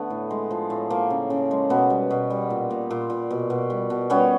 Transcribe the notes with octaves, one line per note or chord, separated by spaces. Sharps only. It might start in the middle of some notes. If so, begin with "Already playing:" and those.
Already playing: D3 A3 B3
A2
G#3
F3
A2
F3 A#3
C#3
C#3
G#3
B2 B3
G3
B2
G3
A#2
A#2
A#2
A#2
B2
B2
G3
B2
G3 B3 C#4